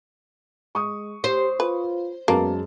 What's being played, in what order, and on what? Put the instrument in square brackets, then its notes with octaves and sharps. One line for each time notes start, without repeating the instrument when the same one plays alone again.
[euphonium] G#3 [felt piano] C#6 D#6
[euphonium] G4 [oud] C5
[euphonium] F4 [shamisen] B4
[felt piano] F#2 G#3 A5 [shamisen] A#3 [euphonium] B3